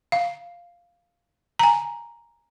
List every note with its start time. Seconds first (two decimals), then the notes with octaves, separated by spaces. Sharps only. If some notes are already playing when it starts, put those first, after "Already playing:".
0.12 F5
1.59 G#5 A#5